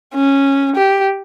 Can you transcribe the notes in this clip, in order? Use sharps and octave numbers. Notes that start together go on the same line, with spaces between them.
C#4
G4